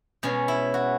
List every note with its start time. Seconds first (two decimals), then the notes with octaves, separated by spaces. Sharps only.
0.23 B2 G#3 C#4
0.48 E4
0.74 F#4